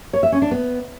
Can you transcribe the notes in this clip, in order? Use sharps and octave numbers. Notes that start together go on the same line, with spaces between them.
C#5
E5
C#4
D4
B3